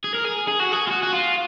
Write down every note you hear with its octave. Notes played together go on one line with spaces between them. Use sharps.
G#4
A#4
G#4
G#4
F#4
G#4
F4
F#4
F#4
F4